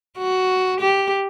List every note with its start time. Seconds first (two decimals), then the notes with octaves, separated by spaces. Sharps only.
0.18 F#4
0.81 G4